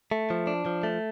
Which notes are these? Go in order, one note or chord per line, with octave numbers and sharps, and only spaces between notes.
A3
F3
D4
F3
A3